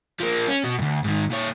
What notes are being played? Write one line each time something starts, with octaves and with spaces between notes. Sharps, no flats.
F3 A#3
C#4
B2
D2 G2
G#2 D#3
A#2 C#5